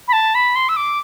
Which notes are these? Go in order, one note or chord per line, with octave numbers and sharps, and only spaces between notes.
B5
A5
B5
C6
E6
D6